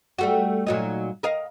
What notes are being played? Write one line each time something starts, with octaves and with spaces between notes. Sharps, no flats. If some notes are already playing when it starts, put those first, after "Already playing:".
G3 A3 F#4
A#2 F#3 D#4
A#4 D#5 F5